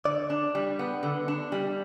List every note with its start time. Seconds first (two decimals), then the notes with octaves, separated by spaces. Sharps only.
0.05 D3 D5
0.30 D4
0.55 G3
0.79 B3
1.03 D3
1.28 D4
1.52 G3